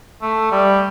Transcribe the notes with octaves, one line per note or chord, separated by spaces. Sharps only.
A3
G3